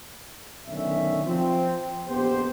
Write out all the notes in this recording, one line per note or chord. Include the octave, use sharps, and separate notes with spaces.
B1 D3 D#3 C#4 E5
F3 C4
A#1 F2 B3 G4 C5